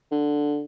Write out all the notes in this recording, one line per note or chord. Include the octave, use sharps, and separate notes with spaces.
D3